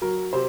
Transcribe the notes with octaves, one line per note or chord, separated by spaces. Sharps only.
F#3 A#4
C3 C5